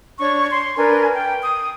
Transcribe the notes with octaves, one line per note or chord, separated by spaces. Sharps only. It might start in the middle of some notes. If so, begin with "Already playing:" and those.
D4 C#5 C#6
C6
D4 A#4 B4 G#5
G5
D#6